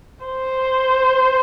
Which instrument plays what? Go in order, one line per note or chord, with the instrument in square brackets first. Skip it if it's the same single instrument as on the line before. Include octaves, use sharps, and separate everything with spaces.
[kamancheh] C5